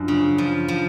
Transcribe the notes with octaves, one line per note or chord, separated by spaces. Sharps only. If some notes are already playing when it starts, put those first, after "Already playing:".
Already playing: F#2 F3 D4
C#3
F3
F3